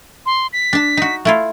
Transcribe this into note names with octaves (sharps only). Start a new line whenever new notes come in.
C6
B6
D4 A5
D#4 F#4
A3 E4 F4